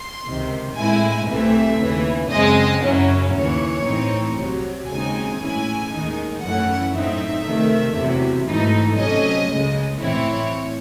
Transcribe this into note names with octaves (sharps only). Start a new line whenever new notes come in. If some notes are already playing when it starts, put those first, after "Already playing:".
Already playing: C6
C#2 C3 D#3
A2 G#3 C4 E4 G#5
C2 C3 E3 A3 C4 E5
D#2 C#3 E3
F#2 C#3 G#3 C4 D#5
F#2 C#3 F#3 C#4 E4
D#2 C#3 E3 C#5
A2 E3 C4 D#4
C2 C3 F#3
D#2 C#3 G#3 C4 D#4 G#5
A2 E3 G#3 C#4 E4 G#5
D#2 D#3 G#3 D#4
F#2 E3 A3 C#4 E4 F#5
A2 F#3 C4 D#4 E5
C3 D#3 A3
E2 C3 F#3
G#2 E3 A3 D#4
C3 F#3 A3 C#4 D#5
C#2 C#3 G#3
A2 E3 C4 E4 C#5